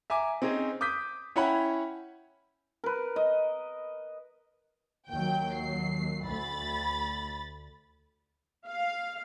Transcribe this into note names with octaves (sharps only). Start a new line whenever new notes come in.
E5 G#5 A#5 D6
C4 C#4 D#4 G#4
D6 D#6 G6 B6
C#4 E4 C#5 F#5 G5 B5
A#4 B4
D#5
D#2 F#3 G5 G6
C7
D2 B5 A6
F5